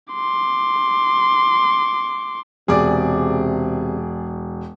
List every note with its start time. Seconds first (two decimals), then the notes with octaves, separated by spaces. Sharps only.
0.13 C6 D6
2.68 E1 C3 G#4 D5 D6